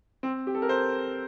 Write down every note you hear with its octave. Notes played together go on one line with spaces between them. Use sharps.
C4
G4
A4
A#4
C5